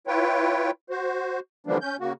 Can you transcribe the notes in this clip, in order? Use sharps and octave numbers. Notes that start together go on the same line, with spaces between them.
E4 F4 B4 C#5 G5
F#4 C5
D3 E3 F3 G3 A#3 D4
C#4 G6
C#3 A#3 F#4